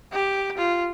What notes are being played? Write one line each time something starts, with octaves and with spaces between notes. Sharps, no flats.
G4
F4